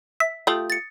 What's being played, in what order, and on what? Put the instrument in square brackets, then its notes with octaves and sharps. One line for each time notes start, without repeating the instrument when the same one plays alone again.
[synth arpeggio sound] E5 [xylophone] B6
[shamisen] A3 F4 G4 [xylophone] D#6 F#7
[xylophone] A6 C#7